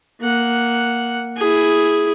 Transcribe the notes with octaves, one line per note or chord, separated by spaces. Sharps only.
A#3 F#5
E4 G#4